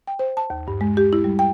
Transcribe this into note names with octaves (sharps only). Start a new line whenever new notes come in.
G5
C5
A5
D#2
G2
G#3
G4
E4
G3
G5